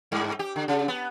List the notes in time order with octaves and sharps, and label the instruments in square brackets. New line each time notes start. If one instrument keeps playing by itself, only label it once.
[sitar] G2
G4
D3
C#3
B3